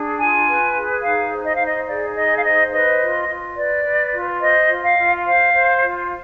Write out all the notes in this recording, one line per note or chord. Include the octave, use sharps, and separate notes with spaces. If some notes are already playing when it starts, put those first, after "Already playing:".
Already playing: D4 G#4
F4 G#5
B4
G#4
D#4 F5
C5
D#5
D#4 F5
D#5
G#4 D5
D#4 D#5
F5
C5 D#5
B4 D#5
F4
F4
B4 D5
B4
F4
C5 D#5
F4
F5
F4
C5 F5
C5
F4